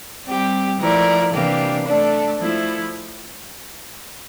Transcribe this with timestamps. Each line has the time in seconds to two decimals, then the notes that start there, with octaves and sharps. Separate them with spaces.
0.26 G3 C4 G4
0.80 F3 A3 E4 A#4 D5
1.33 C3 E3 A#3 D4 G4
1.86 A3 D4 A4 D5
2.40 F3 A3 E4